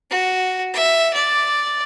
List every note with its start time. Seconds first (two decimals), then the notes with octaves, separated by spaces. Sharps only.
0.10 F#4
0.73 E5
1.14 D5